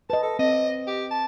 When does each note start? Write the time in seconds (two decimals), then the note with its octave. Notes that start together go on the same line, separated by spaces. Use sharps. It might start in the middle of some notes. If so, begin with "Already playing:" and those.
0.10 B4 D#5 A5
0.23 A4
0.39 C4 D#5
0.87 G4
1.11 A5